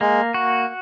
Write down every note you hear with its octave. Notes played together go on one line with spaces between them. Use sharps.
G#3 A#3
F#4